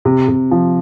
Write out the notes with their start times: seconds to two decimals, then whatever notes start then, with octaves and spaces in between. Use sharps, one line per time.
0.05 C3
0.28 C3
0.51 F3